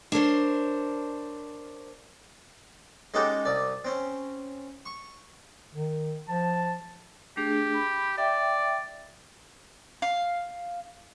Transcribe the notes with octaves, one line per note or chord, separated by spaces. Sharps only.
D4 A#4 C5 C#5
G#3 C#4 D#4 F#4 G4 A4
C2 D5
C4 C#4
C#6
D#3
F3 A5
A3 D4 G4 G#4
B5
D5 E5 G5
F5